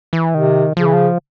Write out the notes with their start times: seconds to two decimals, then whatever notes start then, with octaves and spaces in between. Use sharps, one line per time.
0.13 E3
0.34 C3 D#3
0.77 C#3 F3
0.86 E3
0.93 F3